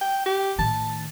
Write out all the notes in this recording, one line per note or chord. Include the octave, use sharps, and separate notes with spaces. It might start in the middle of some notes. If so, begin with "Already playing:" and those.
G5
G4
A2 D#3 A5